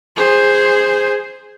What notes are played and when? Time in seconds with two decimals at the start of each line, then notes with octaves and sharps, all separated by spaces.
0.16 G#4 C5